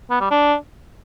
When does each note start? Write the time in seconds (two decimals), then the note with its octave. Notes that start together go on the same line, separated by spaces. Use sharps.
0.10 B3
0.21 G3
0.31 D4